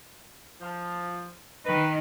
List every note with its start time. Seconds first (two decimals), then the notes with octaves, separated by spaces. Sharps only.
0.61 F3
1.66 D#3 B4